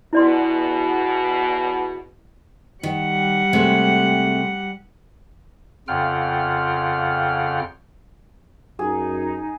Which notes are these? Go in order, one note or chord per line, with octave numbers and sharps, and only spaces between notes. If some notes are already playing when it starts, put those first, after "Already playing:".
E2 B2 E4 D5 C6
D#3 G3 F#5
C3 G#3 A3
F2 C#3 F4 F#5 G5 F6
F#2 D#4 G#4